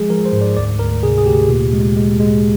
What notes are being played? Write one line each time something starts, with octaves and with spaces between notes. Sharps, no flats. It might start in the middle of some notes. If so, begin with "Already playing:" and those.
Already playing: F3 G#3 G#4
F3 A#4
C5
G#2
D5
D2 D5
D2 A#4
C3 G#4
G#4
D2 G4
A#2
G#3
G#3
G#3